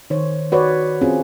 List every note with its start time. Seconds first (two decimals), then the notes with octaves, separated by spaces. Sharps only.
0.10 D#3 C5 C#5
0.52 F#4 B4 C#5 D5
1.01 C4 C#4 F4 G#4